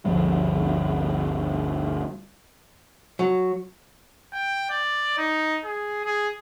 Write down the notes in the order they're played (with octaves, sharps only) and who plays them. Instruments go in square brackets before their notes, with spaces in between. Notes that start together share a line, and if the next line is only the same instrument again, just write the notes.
[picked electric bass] G1 D2 F3 G3
[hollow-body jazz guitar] F#3
[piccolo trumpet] G5
D5
D#4
G#4
G#4